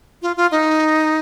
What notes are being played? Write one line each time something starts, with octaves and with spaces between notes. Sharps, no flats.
F4
F4
D#4